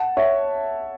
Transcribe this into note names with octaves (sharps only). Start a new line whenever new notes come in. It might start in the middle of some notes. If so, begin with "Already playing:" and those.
Already playing: F#5 A5
C#5 E5